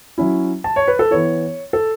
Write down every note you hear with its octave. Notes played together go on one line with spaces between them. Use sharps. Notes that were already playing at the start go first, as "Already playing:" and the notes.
F#3 C#4 E4
A5
C#5
B4
A4
E3 B3 E4 C#5
A4